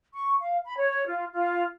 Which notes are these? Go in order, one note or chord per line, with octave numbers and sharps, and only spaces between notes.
C#6
F5
B5
C#5
F4
F4